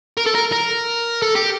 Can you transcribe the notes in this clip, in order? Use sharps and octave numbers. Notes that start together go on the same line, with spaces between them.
A#4
A4
A#4
A#4
A4
G4